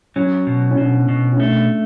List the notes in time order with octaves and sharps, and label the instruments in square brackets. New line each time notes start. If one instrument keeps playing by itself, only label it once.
[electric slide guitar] F#3 [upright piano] C#4
[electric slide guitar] B2
[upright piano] C#4
[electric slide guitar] B2 [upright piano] D4
[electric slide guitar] B2
[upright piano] C#4
[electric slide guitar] A3 [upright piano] D4